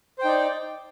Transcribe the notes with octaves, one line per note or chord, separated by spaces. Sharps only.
D#4 C5 D5 G5